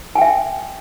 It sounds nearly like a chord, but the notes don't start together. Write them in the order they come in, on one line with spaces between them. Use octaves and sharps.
G#5 G5 E5